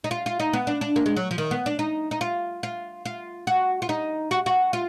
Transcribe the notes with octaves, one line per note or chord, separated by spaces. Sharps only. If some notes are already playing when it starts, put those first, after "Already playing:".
D#4
F4
F4
D#4
B3
D4
D4
A#3
G#3
F#3
F3
D#3
B3
D4
D#4
D#4
F4
F4
F4
F#4
F4
D#4
F#4
F#4
F4